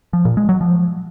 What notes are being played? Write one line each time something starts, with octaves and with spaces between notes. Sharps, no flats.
F3
A#2
G#3
F#3
F3